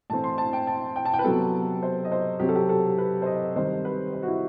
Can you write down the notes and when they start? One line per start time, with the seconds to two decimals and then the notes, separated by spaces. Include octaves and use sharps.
0.10 A2 E3 A3 C4 A5
0.24 C6
0.38 A5
0.53 G5
0.67 A5
0.96 G5
1.05 A5
1.14 G5
1.19 B4
1.24 C3 F#3 B3 A4
1.83 C5
2.05 D#5
2.12 C5
2.40 C3 F#3 C4 G4
2.49 A4
2.55 G4
2.69 A4
2.98 B4
3.22 C5
3.26 D#5
3.56 D#3 G3 C4 C5
3.85 B4
4.13 C5
4.23 F#4
4.28 E4